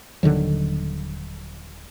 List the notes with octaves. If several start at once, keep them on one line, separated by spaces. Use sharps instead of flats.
D#1 D3 D#3 F#3